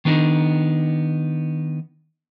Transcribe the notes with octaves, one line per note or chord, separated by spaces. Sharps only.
D#3 B3 D4 D#4